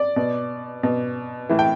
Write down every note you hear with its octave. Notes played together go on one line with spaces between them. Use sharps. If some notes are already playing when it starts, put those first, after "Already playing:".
Already playing: D5
B2
B2
A2 E3
G5